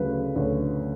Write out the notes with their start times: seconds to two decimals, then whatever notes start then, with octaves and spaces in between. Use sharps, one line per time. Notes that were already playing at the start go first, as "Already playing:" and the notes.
Already playing: D2 C#3 F#3 B4
0.36 D2 C#5